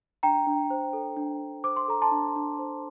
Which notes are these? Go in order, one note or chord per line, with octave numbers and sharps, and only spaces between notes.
D4 G5 A#5
D4
C5
A4
D4
D4
C5 D6
C6
A4 A#5
A5 C6
D4
D4
C5